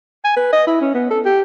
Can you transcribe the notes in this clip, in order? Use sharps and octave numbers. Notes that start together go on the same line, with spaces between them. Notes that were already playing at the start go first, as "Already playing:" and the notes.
G#5
B4
D#5
E4
C#4
B3
A4
G4